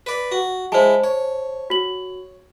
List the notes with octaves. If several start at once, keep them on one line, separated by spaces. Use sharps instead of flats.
B4 D5
F#4
G#3 E4 C5 A5
C#5
F#4 F#7